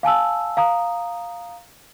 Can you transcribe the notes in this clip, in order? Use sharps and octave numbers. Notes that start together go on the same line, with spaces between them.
F5 G#5 A5 E6
F5 A#5 D#6